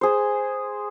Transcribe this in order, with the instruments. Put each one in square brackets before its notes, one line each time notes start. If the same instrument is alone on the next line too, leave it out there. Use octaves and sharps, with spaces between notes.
[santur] G#4 C5